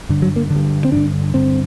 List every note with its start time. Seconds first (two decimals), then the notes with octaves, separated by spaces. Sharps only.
0.09 G2 D3
0.22 F#3
0.36 A#3
0.50 D3
0.56 G2
0.85 C4
0.92 G2 D3 D4
1.34 G2 D3 C4